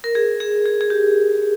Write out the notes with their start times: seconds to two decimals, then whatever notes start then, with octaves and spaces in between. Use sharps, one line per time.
0.04 A#4
0.15 G#4
0.40 G#4
0.66 G#4
0.81 G#4
0.90 G4